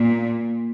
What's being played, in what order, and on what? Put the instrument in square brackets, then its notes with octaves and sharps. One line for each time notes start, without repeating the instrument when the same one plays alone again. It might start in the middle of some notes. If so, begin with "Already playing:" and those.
Already playing: [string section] A#2